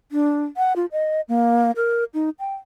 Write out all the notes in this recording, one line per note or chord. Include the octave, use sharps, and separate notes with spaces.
D4
F#5
F4
D#5
A#3
A#4
D#4
G5